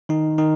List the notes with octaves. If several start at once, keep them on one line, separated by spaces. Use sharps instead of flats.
D#3 D#4
D#3 D#4